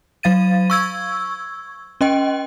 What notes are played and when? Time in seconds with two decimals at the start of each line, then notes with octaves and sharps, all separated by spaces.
0.23 F#3 F5 A6 D#7
0.70 C#6 E6 G#6
2.01 C#4 D#5 G5